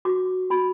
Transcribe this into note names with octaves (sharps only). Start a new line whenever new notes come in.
F#4 D6
F#4 B5